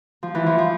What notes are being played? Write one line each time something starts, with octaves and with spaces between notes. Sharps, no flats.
F3
E3
F3
F3